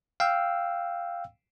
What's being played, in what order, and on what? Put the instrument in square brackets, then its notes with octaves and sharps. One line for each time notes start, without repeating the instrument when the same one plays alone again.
[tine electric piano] F5 G5 E6